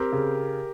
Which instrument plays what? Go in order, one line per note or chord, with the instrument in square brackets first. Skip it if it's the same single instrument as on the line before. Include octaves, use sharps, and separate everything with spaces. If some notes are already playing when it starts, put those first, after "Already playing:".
Already playing: [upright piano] C4 [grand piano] G4 A#4
[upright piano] C#3